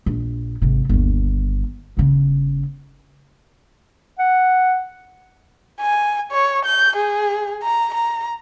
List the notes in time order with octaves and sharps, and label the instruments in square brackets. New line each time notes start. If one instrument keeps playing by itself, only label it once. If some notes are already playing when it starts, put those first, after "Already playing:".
[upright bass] A#1
G#1 C3
G1 D#2
G1 C#3
[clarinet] F#5
[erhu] G#5
C#5
G6
G#4
A#5
A#5